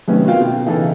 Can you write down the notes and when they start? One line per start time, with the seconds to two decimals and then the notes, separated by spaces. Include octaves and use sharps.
0.08 F#2 C3 D#3 A3 B3 C#4
0.26 F4 F#4 A#4 F5 G5
0.41 B2
0.65 C#3 E3 D#4 A4